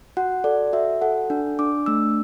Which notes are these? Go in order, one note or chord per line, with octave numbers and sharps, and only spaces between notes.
F#4 F#5
A4 D5
F#4 E5
A4 F#5
D4
D4 D6
A3 E6